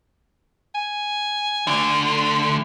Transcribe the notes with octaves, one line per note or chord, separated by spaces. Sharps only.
G#5
D2 D3